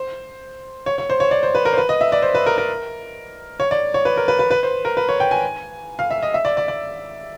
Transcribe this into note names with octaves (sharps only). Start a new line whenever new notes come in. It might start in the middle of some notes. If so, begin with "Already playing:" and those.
Already playing: C5
C#5
C#5
C5
C#5
D5
C5
B4
A#4
C5
B4
D#5
E5
D5
C5
B4
A#4
A#4
C#5
D5
C#5
B4
A#4
B4
B4
B4
C5
A#4
B4
C#5
G5
G#5
F5
E5
D#5
E5
D5
D5
D5